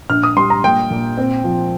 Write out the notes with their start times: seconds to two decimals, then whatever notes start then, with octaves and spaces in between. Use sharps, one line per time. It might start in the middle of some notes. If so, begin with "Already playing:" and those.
0.10 A#1 F6
0.23 D#6
0.36 G3 C6
0.50 A#5
0.64 A#2 G5
0.91 A#2
1.18 C4
1.44 F3